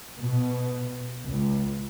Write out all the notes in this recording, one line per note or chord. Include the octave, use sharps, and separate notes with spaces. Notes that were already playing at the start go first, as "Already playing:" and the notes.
B2
C#2